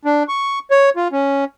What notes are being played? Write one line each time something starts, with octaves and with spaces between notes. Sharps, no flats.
D4
C#6
C#5
F4
C#4